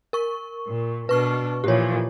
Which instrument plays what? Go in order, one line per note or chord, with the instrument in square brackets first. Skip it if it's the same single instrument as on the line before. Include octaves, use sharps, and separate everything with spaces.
[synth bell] A#4 C#6
[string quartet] A#2
[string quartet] B2 D4 [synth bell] B4 C#6 F6
[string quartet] A#2 E3 F3 [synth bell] G4 C#5